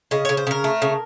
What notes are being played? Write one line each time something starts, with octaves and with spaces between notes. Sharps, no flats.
C#3 D#5
C#3 C#5
C5
C#3 A#4
A3
C#3